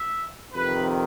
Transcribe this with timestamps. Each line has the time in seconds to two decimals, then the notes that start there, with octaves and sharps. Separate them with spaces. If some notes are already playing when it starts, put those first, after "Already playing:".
Already playing: E5
0.54 F2 C3 D#3 B4